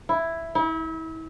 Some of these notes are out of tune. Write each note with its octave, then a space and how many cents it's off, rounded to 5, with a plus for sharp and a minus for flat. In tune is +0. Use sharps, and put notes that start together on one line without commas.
E4 +5
E4 -35